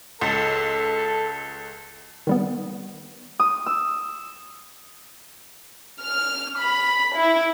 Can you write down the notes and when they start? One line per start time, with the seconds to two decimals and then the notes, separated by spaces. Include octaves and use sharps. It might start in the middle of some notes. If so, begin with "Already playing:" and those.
0.21 C#2 A4
2.27 D#3 G3 B3
3.40 D#6
3.66 E6
6.02 F6
6.60 B5
7.17 E4